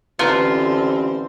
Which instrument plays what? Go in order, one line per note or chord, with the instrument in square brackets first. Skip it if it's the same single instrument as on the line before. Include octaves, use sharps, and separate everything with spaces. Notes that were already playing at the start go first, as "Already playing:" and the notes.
[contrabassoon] A1 [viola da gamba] D3 C4 C5 [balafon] E4 B4 A#5 [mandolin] F4